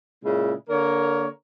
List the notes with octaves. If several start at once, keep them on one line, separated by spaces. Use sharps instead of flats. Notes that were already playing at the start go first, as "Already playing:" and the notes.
A#2 C#3 G#3 E4
D3 A#3 A#4 C#5